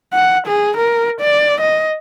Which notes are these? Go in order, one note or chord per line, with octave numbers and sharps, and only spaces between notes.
F#5
G#4
A#4
D5
D#5